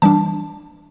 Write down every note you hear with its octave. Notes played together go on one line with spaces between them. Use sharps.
E3 G3 D4 A5